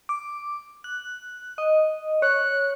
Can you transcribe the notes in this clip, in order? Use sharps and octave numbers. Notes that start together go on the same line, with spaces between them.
D6
F#6
D#5
C#5 F#6